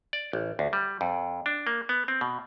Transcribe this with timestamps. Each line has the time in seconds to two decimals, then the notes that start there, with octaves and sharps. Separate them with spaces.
0.13 D5
0.33 A1
0.59 D2
0.73 G3
1.01 F2
1.46 D4
1.67 A#3
1.89 B3
2.08 C4
2.21 B2